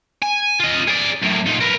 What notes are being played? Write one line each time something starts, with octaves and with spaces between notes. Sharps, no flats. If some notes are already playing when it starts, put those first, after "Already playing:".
G#5
F4 D#5
G#4 D5
F#2 A2
A#2 D#4
A#4 B4